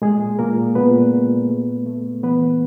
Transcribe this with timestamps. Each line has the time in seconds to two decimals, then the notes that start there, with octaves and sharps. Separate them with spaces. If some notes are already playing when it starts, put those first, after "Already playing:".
0.02 A#2 G#3 G#4
0.39 A#2 A#3 A#4
0.75 A#2 B3 B4
1.13 A#2
1.49 A3
1.86 A3
2.23 E3 B3 B4